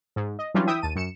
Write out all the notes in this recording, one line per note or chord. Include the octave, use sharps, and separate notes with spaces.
G#2
D#5
E3 F#3 G3 C#4 D4 F4
E3 E5 G5 D#6
D#2 A5 D#7
F#2 C#7 E7